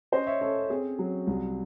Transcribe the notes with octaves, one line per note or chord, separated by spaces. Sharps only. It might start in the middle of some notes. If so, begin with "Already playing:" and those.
C#4 C5 D#5
C#5 E5
C#4 A4 C#5
C4 G#4
F#3
C2